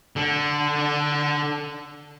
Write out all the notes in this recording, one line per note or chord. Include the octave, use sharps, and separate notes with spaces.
D3 D4